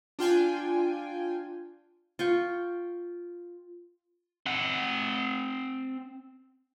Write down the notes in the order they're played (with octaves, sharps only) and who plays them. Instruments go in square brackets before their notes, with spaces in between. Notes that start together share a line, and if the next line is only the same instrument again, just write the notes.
[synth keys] D4 F4 G5 G#5
[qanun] F4 G5 C#6
[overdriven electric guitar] C4 F#5